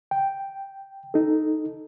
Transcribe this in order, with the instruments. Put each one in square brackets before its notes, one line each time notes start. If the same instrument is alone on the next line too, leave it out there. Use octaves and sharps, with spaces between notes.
[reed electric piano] G5
D#4 A4